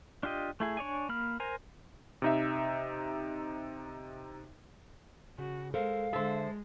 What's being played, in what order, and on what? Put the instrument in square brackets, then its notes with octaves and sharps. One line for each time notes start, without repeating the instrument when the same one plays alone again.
[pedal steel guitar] D4 F4 G4 D#5
A3 E4 G#4
D4 C#5 D5 G#5
A#3 B5 F6
A#4 C5 G#5 A#5
[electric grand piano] C3 D#4 E5
[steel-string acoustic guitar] C#3 [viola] F#4
[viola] G#3 [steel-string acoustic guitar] A4 A#4 C5 [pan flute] F5
[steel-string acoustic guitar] D3 E5 [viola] G#3 [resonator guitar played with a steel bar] A4 C5